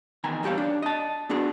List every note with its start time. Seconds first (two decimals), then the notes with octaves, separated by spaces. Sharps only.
0.24 E2 D#3 G5 G#5 A#5
0.43 E2 G2 G4 C#5 F5
0.58 D4
0.82 D#5 A5
1.29 B3 D4 F#4 G#4